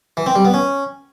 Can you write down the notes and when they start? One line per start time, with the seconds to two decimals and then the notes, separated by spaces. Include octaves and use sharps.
0.17 E3
0.26 C4
0.36 G3
0.45 B3
0.54 C#4